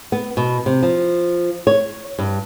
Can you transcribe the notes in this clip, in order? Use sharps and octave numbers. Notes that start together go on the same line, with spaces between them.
B3
B2
C3
F3
C#5
G2